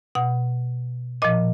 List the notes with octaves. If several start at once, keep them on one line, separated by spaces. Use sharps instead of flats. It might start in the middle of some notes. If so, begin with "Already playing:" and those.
B2 F#5
A#2 F3 D#5